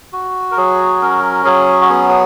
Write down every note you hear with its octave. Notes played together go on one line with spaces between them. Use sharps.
F#4
A#4
F#3 G#4
C#4 A#4
F#3 G#4
F#4
B3 G#4
G#4